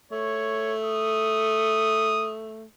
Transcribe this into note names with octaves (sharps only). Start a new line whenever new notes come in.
A3 C#5
D#6